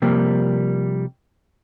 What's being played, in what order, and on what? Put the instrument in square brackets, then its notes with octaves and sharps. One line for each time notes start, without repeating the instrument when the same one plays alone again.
[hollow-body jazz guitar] C3 F3 G3 A#3